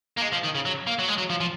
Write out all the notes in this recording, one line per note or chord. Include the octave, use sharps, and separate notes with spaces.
A#3
G#3
F3
D#3
C#3
F#3
A#3
F#3
G#3
F#3
F3
F3